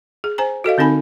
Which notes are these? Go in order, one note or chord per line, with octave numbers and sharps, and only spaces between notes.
G#4
C5 G#5 A#5
F#4 A4 D#5 F5
D3 C4 D#4 G#5 B5